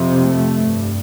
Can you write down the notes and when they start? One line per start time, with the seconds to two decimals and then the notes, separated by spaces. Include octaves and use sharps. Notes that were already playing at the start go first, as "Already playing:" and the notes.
Already playing: F2 C3
0.18 A3
0.56 G2